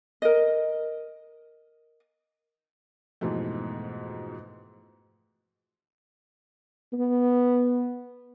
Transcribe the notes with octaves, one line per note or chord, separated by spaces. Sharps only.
A#4 D#5
F2 G#2 B2 E3 A3
B3